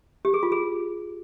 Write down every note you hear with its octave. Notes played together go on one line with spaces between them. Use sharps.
G4
G#4
F4
G#4